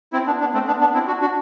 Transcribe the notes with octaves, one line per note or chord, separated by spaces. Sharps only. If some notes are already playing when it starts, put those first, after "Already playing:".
C4 E4
B3 D4
B3 D4
A3 C4
B3 D4
B3 D4
C4 E4
D4 F#4
D4 F#4